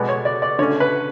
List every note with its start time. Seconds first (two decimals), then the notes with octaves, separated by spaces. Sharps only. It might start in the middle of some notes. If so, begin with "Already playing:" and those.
Already playing: B2 G#3 B3 D5
0.09 C#5
0.25 D5
0.42 D5
0.59 D3 A3 C#4 C#5
0.80 B4